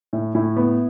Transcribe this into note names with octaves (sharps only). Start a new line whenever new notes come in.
A2
A2 E4
B3